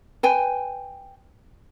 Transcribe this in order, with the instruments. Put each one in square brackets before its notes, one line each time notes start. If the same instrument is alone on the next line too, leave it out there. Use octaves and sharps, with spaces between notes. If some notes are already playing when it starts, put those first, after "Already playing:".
[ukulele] B4 G5 G#5